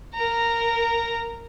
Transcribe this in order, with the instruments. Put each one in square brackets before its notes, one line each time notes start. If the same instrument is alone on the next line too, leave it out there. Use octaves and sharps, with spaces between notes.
[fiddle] A#4 A#5